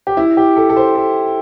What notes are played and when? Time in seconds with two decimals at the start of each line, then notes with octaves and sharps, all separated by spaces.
0.07 G4
0.17 E4
0.37 G4
0.56 A4
0.69 A4
0.77 C5
0.96 A4